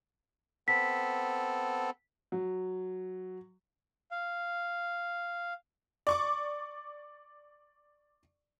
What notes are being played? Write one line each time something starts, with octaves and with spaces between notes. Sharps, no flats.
B3 C4 A4 B6
F#3
F5
D5 C#6 D6